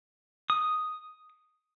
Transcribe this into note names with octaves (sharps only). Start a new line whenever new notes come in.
D#6